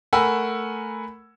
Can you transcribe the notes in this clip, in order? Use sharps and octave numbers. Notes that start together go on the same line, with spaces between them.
A3 A#4 F#5 G#5 B5 E6